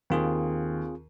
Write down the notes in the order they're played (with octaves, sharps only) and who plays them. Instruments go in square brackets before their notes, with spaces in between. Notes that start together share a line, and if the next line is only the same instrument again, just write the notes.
[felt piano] D#2 [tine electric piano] C4 F4 G#4